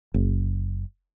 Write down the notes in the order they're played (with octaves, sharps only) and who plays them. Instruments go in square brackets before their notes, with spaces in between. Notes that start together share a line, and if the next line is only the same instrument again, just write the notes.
[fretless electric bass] F#1